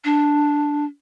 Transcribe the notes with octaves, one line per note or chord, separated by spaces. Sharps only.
D4